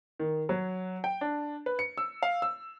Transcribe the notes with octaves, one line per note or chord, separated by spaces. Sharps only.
D#3
F#3
G5
D4
B4
C#7
E6
F5
E6